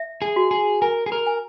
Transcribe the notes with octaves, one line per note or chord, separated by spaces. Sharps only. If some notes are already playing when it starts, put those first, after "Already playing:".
Already playing: E5
G#4
F#4
G#4
A#4 G#5
G#4
A#4
G#5